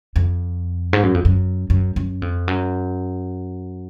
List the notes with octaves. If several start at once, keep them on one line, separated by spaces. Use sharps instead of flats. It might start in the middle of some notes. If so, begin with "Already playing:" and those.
F2
G#2
F#2
F2
F#2
F#2
F#2
F2
F#2